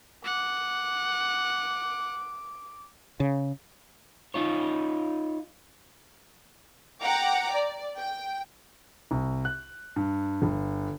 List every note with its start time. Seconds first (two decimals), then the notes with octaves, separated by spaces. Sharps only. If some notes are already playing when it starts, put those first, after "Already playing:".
0.25 F#5 D6
3.20 C#3
4.34 D#4 F4 C#5
7.03 F#5 G5 A#5 D6
7.52 D5
7.99 G5
9.11 C2
9.45 F#6
9.96 G2
10.42 G1